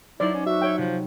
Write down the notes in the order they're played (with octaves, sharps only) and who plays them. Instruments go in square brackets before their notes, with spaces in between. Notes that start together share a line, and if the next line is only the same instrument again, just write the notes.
[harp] F#3 D#4 C5 [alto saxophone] E4 [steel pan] D5
[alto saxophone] C#4
[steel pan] F#4 [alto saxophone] E5
[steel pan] C#5 G5
[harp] C3 [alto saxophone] F3